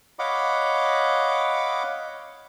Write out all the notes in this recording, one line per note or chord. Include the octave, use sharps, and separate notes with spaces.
C#5 D#5 F5 F#5 B5 D6